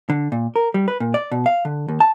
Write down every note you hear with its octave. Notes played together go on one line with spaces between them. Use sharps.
D3
A#2
A#4
G3
B4
A#2
D5
B2
F5
D3
D#2
A5